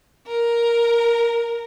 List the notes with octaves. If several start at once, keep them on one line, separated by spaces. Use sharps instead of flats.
A#4